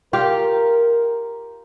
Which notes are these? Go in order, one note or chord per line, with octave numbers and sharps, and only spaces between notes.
F4 G4 A#4 F5